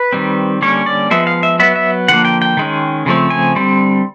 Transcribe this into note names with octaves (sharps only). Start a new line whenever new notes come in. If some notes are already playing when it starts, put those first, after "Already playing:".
Already playing: B4
D#3 G3 C4
D3 G3 A#3 C#4 C#5
D5
F3 G#3 B3 E5
F5
E5
F#3 B3 E5
E5
D3 F3 A#3 F#5
G5
G5
D#3 G#3 C#4
C#3 F3 A3 C4
G#5
D3 G3 C4